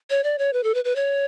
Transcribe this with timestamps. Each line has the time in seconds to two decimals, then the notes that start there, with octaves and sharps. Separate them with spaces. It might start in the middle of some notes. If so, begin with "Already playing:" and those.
0.10 C#5
0.24 D5
0.38 C#5
0.53 B4
0.64 A4
0.74 B4
0.85 B4
0.96 C#5